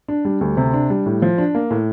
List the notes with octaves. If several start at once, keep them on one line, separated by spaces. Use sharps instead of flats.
D4
G3
D2
C3
D4
G3
A2
F3
D4
A#3
A2